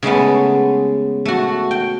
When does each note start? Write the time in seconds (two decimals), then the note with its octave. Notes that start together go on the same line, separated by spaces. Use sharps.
0.03 C#3 G#3 A3 B3
1.25 A3 F#4
1.71 G5